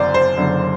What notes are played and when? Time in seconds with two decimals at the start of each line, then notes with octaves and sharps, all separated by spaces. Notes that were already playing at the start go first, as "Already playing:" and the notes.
Already playing: F#1 F#2 D3 C5 D5
0.14 C5
0.38 F#1 F#2 D3